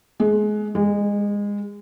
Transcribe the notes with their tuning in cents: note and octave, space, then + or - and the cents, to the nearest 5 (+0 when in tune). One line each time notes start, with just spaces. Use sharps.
G#3 +25
G#3 -25